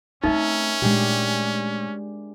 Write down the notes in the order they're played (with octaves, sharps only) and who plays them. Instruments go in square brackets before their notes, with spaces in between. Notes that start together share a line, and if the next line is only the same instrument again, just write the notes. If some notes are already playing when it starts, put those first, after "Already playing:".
[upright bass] A3 C4 [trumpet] C#4 [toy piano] D#4 [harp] A#4 D#5 E5
[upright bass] A#2 A3 [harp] G#3 D4 G4